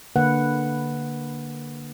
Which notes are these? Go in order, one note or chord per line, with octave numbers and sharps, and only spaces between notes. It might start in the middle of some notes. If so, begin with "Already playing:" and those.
D3 A#3 B4 F#5